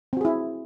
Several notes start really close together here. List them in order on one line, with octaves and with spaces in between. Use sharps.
C4 F#4 G#4 E4